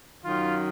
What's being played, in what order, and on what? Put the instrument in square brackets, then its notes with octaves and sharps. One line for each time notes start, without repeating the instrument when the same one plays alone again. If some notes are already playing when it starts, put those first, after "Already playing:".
[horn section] F#2 D#3 F#3 F4